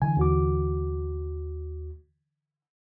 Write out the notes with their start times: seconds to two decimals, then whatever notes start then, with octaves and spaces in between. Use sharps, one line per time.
0.02 D3 E3 G#5
0.17 D#2 F#4 D6